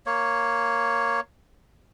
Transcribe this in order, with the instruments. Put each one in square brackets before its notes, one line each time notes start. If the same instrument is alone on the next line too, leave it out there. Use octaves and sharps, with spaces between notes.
[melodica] A#3 C#5